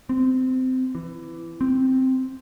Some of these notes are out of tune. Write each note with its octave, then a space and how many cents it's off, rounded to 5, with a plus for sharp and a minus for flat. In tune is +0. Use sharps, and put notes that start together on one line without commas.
C4 -20
E3 +20
C4 -5